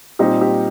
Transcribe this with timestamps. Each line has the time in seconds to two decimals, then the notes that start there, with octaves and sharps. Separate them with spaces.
0.19 A#2 G3 C4 D#4 G4
0.41 G4